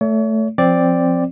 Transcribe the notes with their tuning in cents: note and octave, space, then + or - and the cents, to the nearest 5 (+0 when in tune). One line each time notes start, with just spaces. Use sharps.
A3 +0 C#5 +40
F3 +0 C4 +0 D5 +0